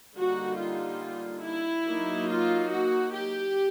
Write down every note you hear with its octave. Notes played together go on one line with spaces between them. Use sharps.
D3 G3 A#3 D#4 F#4
F4
E4
F#3 A#3 D#4
F4
F#4
G4